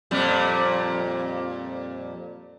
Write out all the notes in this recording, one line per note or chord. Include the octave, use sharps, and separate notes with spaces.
F2 A#2 G3